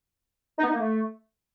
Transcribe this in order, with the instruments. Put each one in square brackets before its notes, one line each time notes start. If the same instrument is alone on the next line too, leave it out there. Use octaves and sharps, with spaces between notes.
[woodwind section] D#4
B3
D#4
A#3
A3